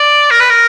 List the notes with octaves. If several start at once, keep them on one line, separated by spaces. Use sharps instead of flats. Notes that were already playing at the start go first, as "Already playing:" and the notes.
Already playing: D5
A#4
B4
A#4